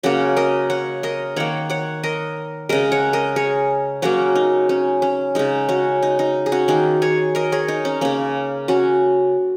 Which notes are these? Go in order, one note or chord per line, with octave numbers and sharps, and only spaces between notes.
C#3 F#3 A#3 C#4 F#4
A#4 D#5
C#5 F#5
A#4 D#5
D#3 A#3 C#5 F#5
C#5 F#5
A#4 D#5
C#3 G#3 A#4 D#5
C#5 F#5
A#4 D#5
G#4 C#5
C#3 F#3 A#3 C#4 F#4
D#4
C#4
C#4
C#3 G#3 D#4
C#4 F#4
D#4
D#4
G#4
C#4 F#4
D#3 A#3 D#4 G#4
G#4 C#5
A#4 D#5
G#4 C#5
D#4
C#4
C#3 A#3 C#4
C#4 F#4